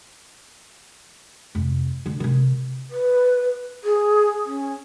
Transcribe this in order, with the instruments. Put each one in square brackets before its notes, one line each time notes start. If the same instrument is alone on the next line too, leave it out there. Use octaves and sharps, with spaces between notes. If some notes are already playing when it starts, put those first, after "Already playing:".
[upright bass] F2 C3
D3 D4
C3 D#3
[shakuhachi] B4
G#4
C#4